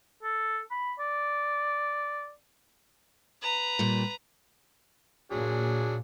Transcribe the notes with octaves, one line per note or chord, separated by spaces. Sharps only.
A4
B5
D5
B4 A#5
A#2 G3
A#2 F#3 D4 G#4